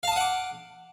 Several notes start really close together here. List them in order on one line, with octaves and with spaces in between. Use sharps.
F5 A5 D#6 F#5 D6